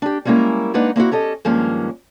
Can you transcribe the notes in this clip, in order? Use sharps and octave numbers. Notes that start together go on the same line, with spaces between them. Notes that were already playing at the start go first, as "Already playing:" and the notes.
D4 G4
G3 G#3 A#3 C#4 E4 A#4
G#3 A#3 D4 D#4 B4 F#5
A#3 C4 E4 F#4
C#4 G4 A4 D#5
G2 D#3 F3 G#3 A#3 C#4